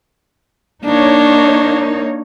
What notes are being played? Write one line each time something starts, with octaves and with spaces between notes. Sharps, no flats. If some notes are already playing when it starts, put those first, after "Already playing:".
A#3 D4 D#4 C#5